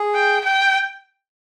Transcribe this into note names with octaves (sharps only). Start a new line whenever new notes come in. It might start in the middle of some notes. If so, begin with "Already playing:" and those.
Already playing: G#4
G5
G5